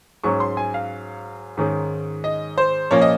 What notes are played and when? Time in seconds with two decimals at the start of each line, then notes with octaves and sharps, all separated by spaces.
0.24 G#2 F#3 C#4 C#6
0.40 C6
0.57 G#5
0.74 F5
1.57 G#2 D#3 G#3 C#4
2.24 D#5
2.58 C5
2.91 A#2 F3 A#3 C#4 C#5
3.02 D#5